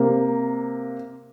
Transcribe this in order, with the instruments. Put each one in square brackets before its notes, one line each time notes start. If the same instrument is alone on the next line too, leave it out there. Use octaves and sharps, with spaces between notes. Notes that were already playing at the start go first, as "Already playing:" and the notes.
Already playing: [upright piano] C3 A#3